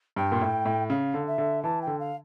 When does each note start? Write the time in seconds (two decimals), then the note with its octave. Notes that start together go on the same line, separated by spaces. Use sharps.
0.16 G2 G5
0.32 A#2
0.42 A2
0.65 A2
0.90 C#3 F5
1.14 D3
1.27 E5
1.38 D3
1.63 E3 A5
1.81 G5
1.87 D3
1.99 F5